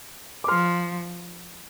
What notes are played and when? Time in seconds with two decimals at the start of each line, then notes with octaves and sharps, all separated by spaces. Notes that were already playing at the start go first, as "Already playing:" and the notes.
0.44 D6
0.48 F3 C6 F6